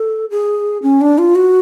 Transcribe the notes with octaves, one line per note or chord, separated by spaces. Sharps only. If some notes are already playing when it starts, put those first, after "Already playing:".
Already playing: A4
G#4
C#4
D4
F4
F#4